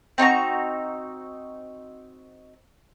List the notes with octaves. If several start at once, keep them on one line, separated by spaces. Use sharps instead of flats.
C4 D#4 F#4 A#5